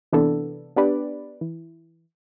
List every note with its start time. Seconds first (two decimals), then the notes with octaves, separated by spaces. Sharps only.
0.12 C3 E3 B3 D4 A4
0.76 B3 D4 G4 B4 D5
1.41 E3